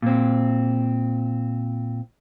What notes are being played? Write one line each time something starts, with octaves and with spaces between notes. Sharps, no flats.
A#2 C4